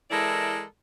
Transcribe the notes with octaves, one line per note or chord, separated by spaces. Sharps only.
E3 G#3 E4 A4 A#4 D5